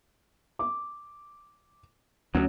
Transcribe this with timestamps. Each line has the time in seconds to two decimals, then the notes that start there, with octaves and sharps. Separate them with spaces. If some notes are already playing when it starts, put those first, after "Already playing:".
0.59 D6
2.35 D2 F#3 C#4